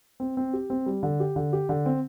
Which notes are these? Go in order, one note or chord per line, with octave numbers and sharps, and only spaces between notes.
C4
C4
G4
C4
G3
D3
G4
D3
G4
D3
C4